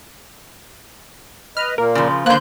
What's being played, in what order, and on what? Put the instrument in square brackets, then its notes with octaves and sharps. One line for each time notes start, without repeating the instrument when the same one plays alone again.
[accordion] B4 D#5 [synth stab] F6
[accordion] A#2 A#3 [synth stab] A#4
[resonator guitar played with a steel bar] C#3 F3
[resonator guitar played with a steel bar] F2 D3 [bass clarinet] A#3 [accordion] C5 C6 [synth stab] F#6 G6